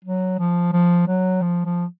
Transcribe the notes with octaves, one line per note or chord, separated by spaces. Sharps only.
F#3
F3
F3
F#3
F3
F3